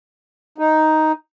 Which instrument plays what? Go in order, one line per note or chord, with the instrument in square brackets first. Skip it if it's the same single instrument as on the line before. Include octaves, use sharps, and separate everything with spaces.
[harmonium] D#4